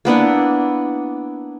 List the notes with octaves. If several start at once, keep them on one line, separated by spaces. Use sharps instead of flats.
A#3 B3 D4 E4